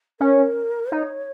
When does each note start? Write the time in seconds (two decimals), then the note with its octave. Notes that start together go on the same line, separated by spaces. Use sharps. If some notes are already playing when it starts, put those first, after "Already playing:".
0.20 C#4 A#4
0.92 D#4 C#5